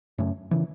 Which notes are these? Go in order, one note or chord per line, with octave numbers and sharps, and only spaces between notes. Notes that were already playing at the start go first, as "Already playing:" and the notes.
F#2 C#3 A3 C#4
C#3 E3